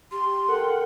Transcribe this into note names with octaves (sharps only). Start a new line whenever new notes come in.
G4 C6
A4 A#4 F#5 G5